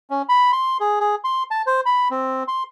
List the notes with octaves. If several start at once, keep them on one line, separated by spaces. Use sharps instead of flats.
C#4
B5
C6
G#4
G#4
C6
A5
C5
B5
C4
C6